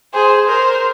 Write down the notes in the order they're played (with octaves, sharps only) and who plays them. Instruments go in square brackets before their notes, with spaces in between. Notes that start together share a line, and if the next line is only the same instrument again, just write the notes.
[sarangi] G#4 [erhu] C5
[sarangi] A#4 [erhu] C5